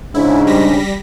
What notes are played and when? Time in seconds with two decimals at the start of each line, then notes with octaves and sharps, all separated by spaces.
0.14 G#2 C#3 D4 E4
0.47 G3 A#6 B6